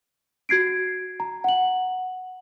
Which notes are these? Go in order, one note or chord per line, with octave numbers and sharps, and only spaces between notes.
F#4 G#6 C7 D7
A#5
F#5 F#7